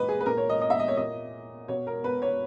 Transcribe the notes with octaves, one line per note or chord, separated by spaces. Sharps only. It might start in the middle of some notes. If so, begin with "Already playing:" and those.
Already playing: A#2 B4 D#5
G#4
B4
A#2 A#4
C#5
D#5
D#5
E5
D#5
C#5
A#2 D#5
B2 C#5
A#4
B4
C#5